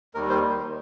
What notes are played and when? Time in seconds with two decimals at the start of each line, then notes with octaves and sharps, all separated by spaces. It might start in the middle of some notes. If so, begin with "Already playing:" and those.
0.15 D#2 D#3 G3 A#4
0.30 C5